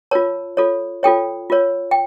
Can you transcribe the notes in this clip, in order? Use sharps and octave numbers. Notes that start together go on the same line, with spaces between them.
F4 A#4 C#5 A5
F4 A4 C#5
F4 A4 C#5 G5
F4 A#4 C#5
G5